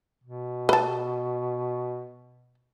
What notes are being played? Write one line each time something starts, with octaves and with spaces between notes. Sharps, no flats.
B2
B4 A5